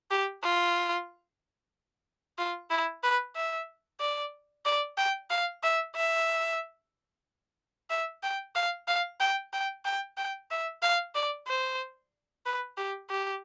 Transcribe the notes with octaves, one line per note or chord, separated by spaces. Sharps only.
G4
F4
F4
E4
B4
E5
D5
D5
G5
F5
E5
E5
E5
G5
F5
F5
G5
G5
G5
G5
E5
F5
D5
C5
B4
G4
G4